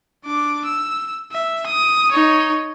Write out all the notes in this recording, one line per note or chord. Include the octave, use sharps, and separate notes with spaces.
D4 D6
E6
E5
D#6
D#4 C#5